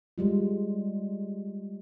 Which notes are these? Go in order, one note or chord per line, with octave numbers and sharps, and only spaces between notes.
G3 G#3 F4